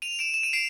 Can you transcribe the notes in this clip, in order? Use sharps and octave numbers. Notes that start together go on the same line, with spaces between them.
D#7 F7
D7 E7
E7
D#7
C7 D7